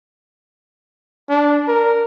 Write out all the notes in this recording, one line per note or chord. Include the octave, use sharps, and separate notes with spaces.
D4
A#4